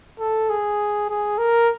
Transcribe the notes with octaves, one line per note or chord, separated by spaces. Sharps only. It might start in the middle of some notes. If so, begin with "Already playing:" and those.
A4
G#4
G#4
A#4